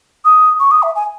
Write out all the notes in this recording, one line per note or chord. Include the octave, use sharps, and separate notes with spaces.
D#6
C#6
D#6
E5
G#5